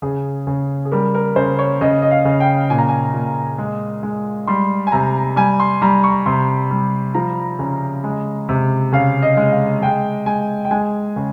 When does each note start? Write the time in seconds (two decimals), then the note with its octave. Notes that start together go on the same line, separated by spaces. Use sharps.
0.02 C#3 G#4
0.47 C#3
0.85 G#4
0.92 G3 A#4
1.15 A#4
1.36 C#3 C5
1.59 C#5
1.81 C#3 D#5
2.02 D#5
2.11 F5
2.25 C#3
2.40 G5
2.70 A#2 G#5
2.78 A#5
2.89 G#5
3.14 A#2
3.58 G#3
4.03 G#3
4.47 G3 C6
4.87 G#5
4.92 C3 A#5
5.36 G3 G#5
5.60 C6
5.82 G3 A#5
6.04 C#6
6.26 C3 C6
6.71 G3
7.14 F3 A#5
7.59 C#3
8.04 G#3
8.49 C3
8.92 C#3 F5
9.22 D#5
9.37 G#3
9.52 F5
9.82 G#3 G5
10.26 G#3 G#5
10.65 G5
10.71 G#3 G#5
11.16 C#3